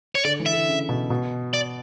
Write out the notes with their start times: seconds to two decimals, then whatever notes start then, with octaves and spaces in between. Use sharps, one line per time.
0.15 C#5
0.25 D3 D5
0.40 E3
0.46 E5
0.53 D3
0.68 C#3
0.89 B2
1.10 B2
1.54 D5